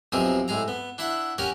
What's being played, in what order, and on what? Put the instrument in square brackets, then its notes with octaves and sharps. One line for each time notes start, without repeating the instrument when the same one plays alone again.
[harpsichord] B1 C3 F3 G#4 A#4 D#6
A2 G#3 G#4 A#5
B3
D4 E4 E5 F#5
C#4 G4 A#4 F#5 G#5 A#5